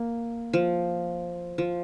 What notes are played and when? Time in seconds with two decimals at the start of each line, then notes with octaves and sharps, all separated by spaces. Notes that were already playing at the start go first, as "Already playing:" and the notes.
Already playing: A#3
0.53 F3
1.58 F3